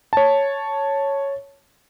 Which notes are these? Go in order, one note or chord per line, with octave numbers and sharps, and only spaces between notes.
C#5 A5